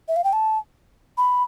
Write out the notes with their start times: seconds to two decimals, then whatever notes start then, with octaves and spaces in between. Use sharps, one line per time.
0.08 E5
0.16 F5
0.24 G5
0.33 A5
1.18 B5